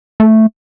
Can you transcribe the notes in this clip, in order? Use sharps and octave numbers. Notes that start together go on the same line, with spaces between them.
A3